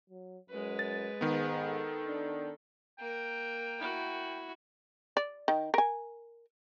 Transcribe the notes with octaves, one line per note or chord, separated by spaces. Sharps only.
F#3
F#2 G#3 B4
A6
G#2 D#3 B3
A4
D4
A#3 A#4 G5
E4 F#4
D5
D#3
A#4 G#5